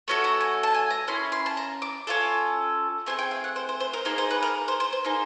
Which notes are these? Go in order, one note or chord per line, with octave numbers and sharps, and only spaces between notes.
A3 C#4 F#4 A4
A#5
G#5
A5
G#5
A#5
A#3 C#4 E4 C6
C6
A5
A#5
D6
C#4 F4 A4
A3 C4 G#4 G#5
G5
F5
F#5
C5
C5
C5
A#4
A#3 D#4 G#4 C5
C5
B4
A#4
C5
C5
C5
A#3 D#4 G#4